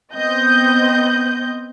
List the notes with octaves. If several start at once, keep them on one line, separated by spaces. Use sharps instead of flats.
B3 C4 D#5 G6